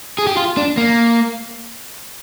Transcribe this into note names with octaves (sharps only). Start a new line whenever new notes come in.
G#4
G4
F4
D4
A#3